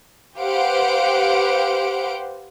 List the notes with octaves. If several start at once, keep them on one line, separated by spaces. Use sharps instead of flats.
G4 B4 C5 F5 F#5 D7